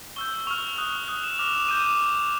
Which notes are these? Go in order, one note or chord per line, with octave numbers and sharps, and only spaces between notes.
C#6 E6 G6 G7
F#7
C#6 F6 F7
D#6 F#6
D#6 F#6 F7
E7
D6 F6 F7
E7
D6 G6 D#7